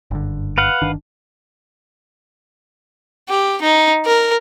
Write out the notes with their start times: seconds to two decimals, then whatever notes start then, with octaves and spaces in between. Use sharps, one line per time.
0.11 F#1 G2 D3
0.58 B4 F5 F#5
0.82 G1 D#3 D4
3.29 G4
3.62 D#4
4.06 A#4